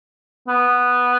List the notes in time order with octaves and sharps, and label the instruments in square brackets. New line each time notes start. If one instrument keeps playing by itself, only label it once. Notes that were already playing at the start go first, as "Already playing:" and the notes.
[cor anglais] B3